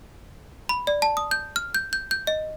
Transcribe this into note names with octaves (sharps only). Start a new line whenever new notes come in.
B5
D5
A5
D#6
G6
F6
G6
G6
G6
D#5